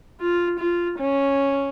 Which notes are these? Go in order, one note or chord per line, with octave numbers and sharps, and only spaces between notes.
F4
F4
C#4